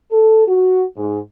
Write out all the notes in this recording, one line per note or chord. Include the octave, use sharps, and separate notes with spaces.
A4
F#4
G#2